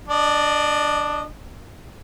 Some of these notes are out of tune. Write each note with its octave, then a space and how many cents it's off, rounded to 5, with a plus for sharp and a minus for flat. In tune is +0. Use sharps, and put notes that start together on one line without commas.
D4 +0 D#5 -30